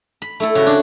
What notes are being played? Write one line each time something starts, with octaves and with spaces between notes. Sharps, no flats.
B5
A3 E4 A4
C#3 F#4
D4